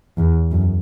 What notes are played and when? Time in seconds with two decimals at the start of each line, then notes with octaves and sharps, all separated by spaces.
0.18 E2
0.52 F#2